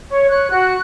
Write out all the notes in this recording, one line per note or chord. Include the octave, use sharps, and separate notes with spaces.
C#5
C#5 F#6
F#4